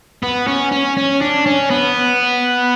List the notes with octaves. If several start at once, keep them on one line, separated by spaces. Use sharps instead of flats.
B3
C#4
C#4
C#4
D4
C#4
B3